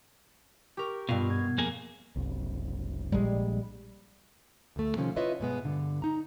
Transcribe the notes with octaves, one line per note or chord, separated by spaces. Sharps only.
G4 A#4 C#6
G2 B2 F4 F5
B3 G#6
F2 A#3 G#4
F#1 C2
A#1 G3 G#3
D2 A3
C3 D#3 F3 C#4
E4 F4 B4 C#5 D#5 E5
G2 B2 G#3 B3
G2 D3
D#4 A#5